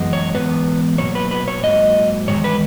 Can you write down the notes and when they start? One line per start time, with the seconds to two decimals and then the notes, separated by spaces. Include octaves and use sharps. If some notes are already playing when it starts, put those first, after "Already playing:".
Already playing: F#2 E3 G#3 B3
0.13 C#5
0.34 G#2 E3 B3 B4
0.98 B2 F#3 A#3 C#5
1.15 B4
1.31 B4
1.48 C#5
1.63 G#2 F#3 A#3 D#5
2.28 E2 D#3 G#3 C#5
2.44 B4